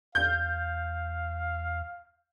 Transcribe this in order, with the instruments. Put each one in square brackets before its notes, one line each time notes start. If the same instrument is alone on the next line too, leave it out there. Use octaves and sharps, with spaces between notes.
[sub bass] E2 [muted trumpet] F5 [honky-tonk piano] G6